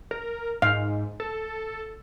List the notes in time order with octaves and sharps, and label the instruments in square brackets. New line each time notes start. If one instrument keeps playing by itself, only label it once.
[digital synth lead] A#4
[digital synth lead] G#2 [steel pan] F5
[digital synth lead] A4